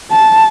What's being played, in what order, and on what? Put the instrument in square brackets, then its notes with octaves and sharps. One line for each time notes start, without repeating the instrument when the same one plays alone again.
[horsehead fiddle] A5